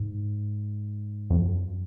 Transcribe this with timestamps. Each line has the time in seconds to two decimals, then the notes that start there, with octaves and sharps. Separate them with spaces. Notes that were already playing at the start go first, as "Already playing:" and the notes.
Already playing: G#2
1.30 F2
1.40 F#2